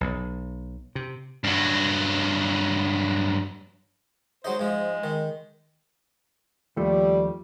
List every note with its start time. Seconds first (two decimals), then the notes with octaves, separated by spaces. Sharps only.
0.01 B1
0.95 C3
1.44 G2 F#3
4.44 F#3 G#3 D#4 C5
4.60 G#2 F3 G#3
5.04 D#3
6.77 D#2 F3 G3 A3